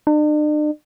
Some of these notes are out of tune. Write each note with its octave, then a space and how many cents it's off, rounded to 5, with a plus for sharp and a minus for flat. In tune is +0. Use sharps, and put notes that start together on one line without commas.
D4 +45